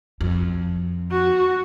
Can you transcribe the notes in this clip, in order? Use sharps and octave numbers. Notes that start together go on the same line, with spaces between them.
F2
F#4